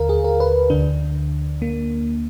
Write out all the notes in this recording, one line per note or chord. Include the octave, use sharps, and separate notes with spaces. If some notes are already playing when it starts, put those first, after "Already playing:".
Already playing: D#2 D3 A#4 F5
G#4
A#4
B4
D2 D3 D4
A#3